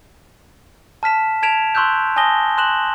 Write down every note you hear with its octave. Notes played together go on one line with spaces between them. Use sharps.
A5 F6 B6 E7
A5 G#6 B6 D7 E7 F7
C6 C#6 E6 F#6 G6
G#5 A5 D#6 A#6 G7
C6 F#6 E7 F#7